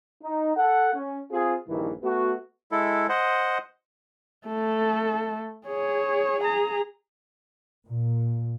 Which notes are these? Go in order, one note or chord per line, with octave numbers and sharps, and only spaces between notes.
D#4
A4 F#5
C#4
C4 F4 G#4
A#1 G2 D#3 E3
A3 B3 F#4
G#3 E4 A4
C5 D#5 F#5
A3 A4
G#4 C#5
G#4 A#5
A#2